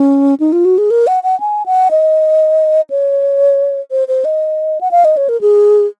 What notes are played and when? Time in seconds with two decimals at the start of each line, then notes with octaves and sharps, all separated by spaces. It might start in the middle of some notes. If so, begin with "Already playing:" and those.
Already playing: C#4
0.40 D#4
0.52 F4
0.65 F#4
0.78 G#4
0.91 A#4
1.07 F#5
1.23 F#5
1.40 G#5
1.66 F#5
1.91 D#5
2.90 C#5
3.91 C5
4.08 C5
4.25 D#5
4.81 F#5
4.91 F5
5.05 D#5
5.17 C#5
5.29 A#4
5.41 G#4